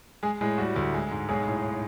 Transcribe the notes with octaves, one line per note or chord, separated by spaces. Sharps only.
G#3 G#4
A2 G#3 G#4
G3 F#4
D2
G#3
G#2
B1 G#3 G#4
A2